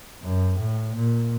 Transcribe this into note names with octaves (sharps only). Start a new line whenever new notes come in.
F#2
A2
A#2